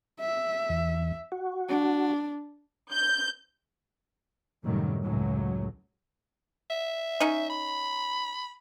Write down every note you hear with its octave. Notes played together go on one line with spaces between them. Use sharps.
E5
E2
F#4
D4
G6
F#2 A2 C3 D#3 F#3 G3
C#2 F#2 A2 F#3
E5
C#4 D#4
B5